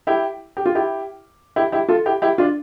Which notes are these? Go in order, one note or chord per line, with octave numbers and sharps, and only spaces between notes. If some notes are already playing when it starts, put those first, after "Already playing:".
E4 G4
G4
F4
E4 G4
E4 G4
E4 G4
F4 A4
E4 G4
E4 G4
D4 F4